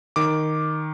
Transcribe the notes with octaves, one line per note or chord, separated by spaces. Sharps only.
D#3 D6